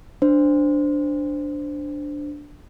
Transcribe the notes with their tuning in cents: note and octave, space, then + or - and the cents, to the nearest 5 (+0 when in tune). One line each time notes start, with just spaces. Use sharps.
D4 +0 C5 -10